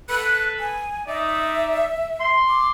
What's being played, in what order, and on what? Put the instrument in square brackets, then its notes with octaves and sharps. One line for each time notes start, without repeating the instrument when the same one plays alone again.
[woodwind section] A4 B4 [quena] F#6
[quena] G#5
[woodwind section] D#4 D5 [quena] E5
[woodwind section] C6
[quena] D6